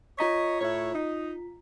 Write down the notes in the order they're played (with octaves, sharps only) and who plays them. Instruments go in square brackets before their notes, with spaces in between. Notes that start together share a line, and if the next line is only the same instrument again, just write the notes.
[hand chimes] F4 A#5 B6 [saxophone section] C#5 D#5
[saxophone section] A2 E4 C#5
D#4